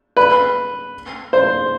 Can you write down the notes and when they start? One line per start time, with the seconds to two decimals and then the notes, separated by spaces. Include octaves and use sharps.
0.17 B4
1.33 C5